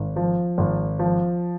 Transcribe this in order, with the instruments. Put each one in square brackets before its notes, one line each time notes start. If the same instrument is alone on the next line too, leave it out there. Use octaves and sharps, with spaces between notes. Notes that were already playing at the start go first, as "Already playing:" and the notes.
Already playing: [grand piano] G#1
F3
G#1
F3